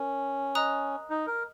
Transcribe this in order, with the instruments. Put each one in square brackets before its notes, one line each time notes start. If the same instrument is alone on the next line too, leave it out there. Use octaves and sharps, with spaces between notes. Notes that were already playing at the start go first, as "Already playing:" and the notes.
Already playing: [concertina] C#4 [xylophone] A#4
[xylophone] D#5 A#5 D#6 F#6
[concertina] D#4
A#4